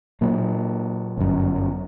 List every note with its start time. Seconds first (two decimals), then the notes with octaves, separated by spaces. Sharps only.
0.21 A#2 F#3 A#3
1.18 G1 F#2